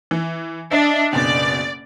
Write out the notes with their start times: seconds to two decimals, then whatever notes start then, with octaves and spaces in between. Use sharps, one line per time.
0.11 E3
0.71 D4 D#5 E5
1.13 F#1 B2 D5